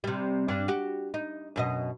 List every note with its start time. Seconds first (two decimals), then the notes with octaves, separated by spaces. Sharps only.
0.04 C3 G3
0.48 G2 D4 D5
0.68 F#4 G4
1.14 D#4
1.56 F#2 B2 D#5